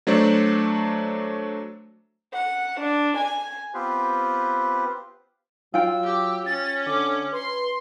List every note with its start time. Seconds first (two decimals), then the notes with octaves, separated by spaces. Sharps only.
0.07 F#3 A3 D4 C5 D5
2.35 F#5
2.81 D4
3.18 G#5
3.74 B3 C4 F4 G4 B4 C5
5.74 F#3 F4 G5 E6
6.04 G4
6.46 C#4 A6
6.86 D3 D6
7.33 B4 C6